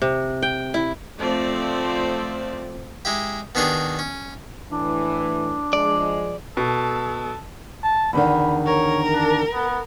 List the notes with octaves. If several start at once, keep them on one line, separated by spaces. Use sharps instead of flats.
C3
G5
E4
F3 A3 C4 D5
G#3 E4 G4
B2 D#3 B3 D4 G4 G#4
C#4
A2 E3 D4
F3 G#3 D5
B2 A4
A5
E2 D3 D#3 B5
A#4 C#5
D4
B3